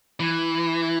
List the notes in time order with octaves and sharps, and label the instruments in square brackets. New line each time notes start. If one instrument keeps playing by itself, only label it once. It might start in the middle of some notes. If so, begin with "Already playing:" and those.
[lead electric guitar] E3